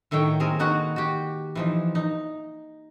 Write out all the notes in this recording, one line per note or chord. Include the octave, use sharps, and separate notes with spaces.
A2 D#3 F#3 C#5 G5
A#3 C4 G#4 A#4
A#3 D#4 F#4 B4 F#5
F#4 G4
E3 F3 D#4
D#4